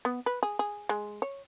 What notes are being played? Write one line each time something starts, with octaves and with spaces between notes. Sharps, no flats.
B3
B4
G#4
G#4
G#3
C#5